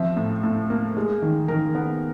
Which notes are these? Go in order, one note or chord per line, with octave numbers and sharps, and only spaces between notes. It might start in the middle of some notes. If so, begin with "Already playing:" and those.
Already playing: F3 C4 E5
A2
A2
A#3
G#3
D#3
D#3 A#4
B3